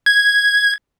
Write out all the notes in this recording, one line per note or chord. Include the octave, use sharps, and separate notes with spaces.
G#6